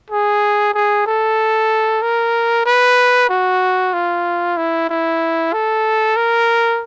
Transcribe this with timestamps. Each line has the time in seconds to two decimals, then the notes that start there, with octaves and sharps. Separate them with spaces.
0.10 G#4
0.74 G#4
1.06 A4
2.02 A#4
2.66 B4
3.29 F#4
3.93 F4
4.57 E4
4.89 E4
5.53 A4
6.17 A#4